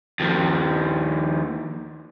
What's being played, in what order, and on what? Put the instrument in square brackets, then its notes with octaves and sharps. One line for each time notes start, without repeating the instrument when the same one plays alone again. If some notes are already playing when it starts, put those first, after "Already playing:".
[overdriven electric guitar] D#2 F3